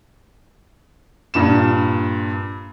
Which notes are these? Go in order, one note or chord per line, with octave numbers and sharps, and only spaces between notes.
G2 A#2 E7